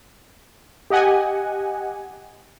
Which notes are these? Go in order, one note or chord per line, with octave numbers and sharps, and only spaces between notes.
G4 D#5 F#5 G#5